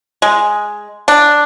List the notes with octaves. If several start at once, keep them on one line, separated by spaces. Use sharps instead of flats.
G#3
D4